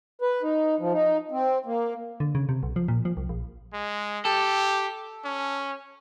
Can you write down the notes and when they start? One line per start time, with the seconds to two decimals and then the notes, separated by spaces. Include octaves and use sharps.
0.22 B4
0.42 D#4
0.80 F3
0.92 D#4
1.31 C4
1.66 A#3
2.20 D3
2.35 C#3
2.49 C3
2.63 B1
2.76 F3
2.88 A#2
3.05 F3
3.17 C2
3.29 A#1
3.73 G#3
4.25 G4 A4
5.25 C#4